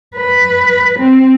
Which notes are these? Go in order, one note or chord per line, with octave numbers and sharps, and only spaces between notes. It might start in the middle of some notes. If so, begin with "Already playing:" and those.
B4
C4